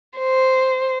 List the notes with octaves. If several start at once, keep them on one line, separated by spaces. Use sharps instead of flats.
C5